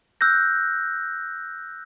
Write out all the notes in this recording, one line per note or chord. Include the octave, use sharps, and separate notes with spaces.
E6 F#6 G6 A#6